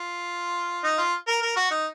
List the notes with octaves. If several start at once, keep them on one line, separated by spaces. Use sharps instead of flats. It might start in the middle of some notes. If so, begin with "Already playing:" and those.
Already playing: F4
D#4
F4
A#4
A#4
F#4
D#4